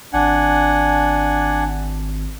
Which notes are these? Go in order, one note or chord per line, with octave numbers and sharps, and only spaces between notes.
G#1 D4 F#5 G#5